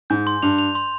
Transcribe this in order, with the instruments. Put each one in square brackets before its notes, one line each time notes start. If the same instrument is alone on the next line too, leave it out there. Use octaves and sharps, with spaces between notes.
[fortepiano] G#2 [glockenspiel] G6
[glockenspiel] C6
[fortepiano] G2 [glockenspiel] F7
[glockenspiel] F7
C6